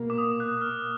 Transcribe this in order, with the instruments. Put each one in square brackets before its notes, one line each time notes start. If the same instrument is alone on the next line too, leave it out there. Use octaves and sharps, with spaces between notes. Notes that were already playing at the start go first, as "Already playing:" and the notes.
Already playing: [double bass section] B2 A#3
[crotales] D6
D#6
F#6
F6